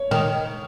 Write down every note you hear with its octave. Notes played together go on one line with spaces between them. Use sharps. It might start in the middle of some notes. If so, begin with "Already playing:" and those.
Already playing: C#5
D#3